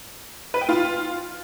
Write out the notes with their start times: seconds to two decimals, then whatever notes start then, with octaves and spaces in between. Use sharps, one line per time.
0.54 B4
0.61 G5
0.69 F4